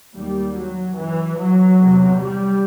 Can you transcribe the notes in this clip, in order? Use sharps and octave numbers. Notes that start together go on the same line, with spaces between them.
D#2 G3
F#3
F#2 E3
F#3
E2 C3
G3